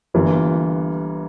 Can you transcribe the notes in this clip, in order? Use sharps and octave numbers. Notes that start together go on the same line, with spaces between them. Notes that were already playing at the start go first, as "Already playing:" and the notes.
G1 G2 E3 A#3 F4